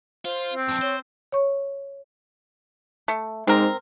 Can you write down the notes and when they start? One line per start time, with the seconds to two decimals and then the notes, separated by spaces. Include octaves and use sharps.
0.25 F4 C5
0.54 C4
0.68 F2 D4
0.81 C5 C#5
1.32 C#5 C#6
3.08 A3
3.47 G#2 C4 A#4